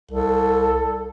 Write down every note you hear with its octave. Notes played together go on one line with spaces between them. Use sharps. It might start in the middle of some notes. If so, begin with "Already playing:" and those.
C2 A4